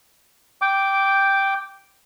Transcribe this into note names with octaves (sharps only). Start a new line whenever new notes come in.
G5 D6